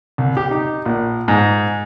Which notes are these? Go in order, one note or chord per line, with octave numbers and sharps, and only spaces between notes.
C2
G4
D#4
A#1
G#2